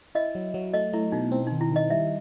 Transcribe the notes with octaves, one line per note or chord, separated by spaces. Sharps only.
E4 D#5
F#3
F#3
A3 D#5
A3 E4
B2 D#4
C4 E4
D#4
D#3
E4
D#3 D#5
G3 E5